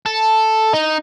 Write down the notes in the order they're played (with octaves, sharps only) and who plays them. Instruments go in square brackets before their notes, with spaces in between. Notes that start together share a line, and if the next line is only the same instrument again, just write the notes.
[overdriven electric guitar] A4
D#4